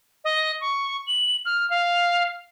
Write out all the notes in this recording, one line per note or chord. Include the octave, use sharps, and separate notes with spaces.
D#5
C#6
F#7
F6
F5